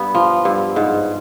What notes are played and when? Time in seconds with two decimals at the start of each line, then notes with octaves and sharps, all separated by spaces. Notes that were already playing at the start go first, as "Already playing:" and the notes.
Already playing: G2 B3
0.15 F3
0.45 G2
0.76 G#2